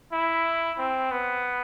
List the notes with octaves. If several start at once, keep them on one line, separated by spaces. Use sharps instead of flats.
E4
C4
B3